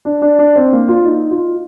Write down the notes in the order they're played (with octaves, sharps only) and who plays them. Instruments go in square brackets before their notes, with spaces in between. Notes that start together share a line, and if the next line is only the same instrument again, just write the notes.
[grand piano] D4
D4
D4
C4
A#3
F4
D#4
F4